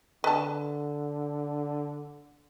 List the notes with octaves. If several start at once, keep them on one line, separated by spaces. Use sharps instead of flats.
D3 B4 A5